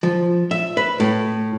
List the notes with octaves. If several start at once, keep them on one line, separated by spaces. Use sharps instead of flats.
F3
E5
B4
A2